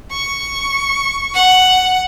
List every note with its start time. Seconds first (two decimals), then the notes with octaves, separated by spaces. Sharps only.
0.12 C#6
1.34 F#5